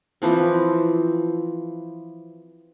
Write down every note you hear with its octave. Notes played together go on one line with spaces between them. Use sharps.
E3 F3 C4